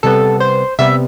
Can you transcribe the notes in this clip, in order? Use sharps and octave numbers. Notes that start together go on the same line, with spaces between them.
C3 G3 B3 A4
C5
C3 G3 B3 E5